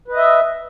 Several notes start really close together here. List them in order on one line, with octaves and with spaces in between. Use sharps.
B4 D#5 E5